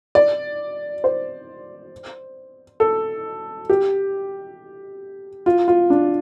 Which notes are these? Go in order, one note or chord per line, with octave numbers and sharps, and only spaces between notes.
D5
C5
A4
G4
F4
F4
D4